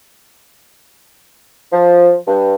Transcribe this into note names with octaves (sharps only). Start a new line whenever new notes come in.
F3
G2